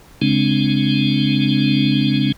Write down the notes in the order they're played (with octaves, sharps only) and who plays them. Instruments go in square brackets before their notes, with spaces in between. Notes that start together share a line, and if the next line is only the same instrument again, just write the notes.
[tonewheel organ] C#3 G#3 C4 D4